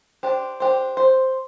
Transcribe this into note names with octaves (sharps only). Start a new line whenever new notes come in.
D4 G4 C5
D4 G4 C5
C5